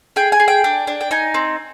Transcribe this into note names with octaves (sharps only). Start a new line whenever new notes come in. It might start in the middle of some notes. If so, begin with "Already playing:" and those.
G#4 G5
G#5
G#4
G5
D4
D4
G5
D#4 G#5
C4